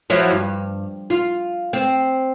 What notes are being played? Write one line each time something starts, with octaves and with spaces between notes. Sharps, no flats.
F3 F#3 E4
G2
F4
C4